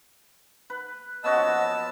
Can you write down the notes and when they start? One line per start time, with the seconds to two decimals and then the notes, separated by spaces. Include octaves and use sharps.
0.70 B4
1.24 B3 C#4 F#4 D#5 A5 E6
1.35 F3